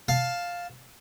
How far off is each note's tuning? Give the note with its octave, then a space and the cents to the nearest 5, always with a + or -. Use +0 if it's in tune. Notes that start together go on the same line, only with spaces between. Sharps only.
F5 +5 A5 +0